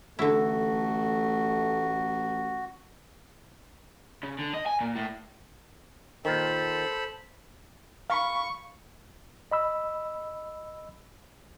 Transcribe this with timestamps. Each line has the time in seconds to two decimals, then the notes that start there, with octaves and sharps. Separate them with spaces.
0.19 A1 D3 A3 E4 F#4
4.23 C#3
4.39 D3
4.54 D#5
4.66 G#5
4.81 A#2
4.96 A2
6.25 A#2 D#3 A4 C5 A5 B5
8.10 F5 B5 C#6
9.51 D#5 B5 E6